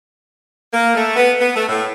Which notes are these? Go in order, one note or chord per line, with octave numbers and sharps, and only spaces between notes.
A#3
A3
B3
B3
A3
A2